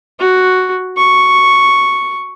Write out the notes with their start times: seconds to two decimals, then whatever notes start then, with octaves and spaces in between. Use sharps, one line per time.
0.20 F#4
0.97 C#6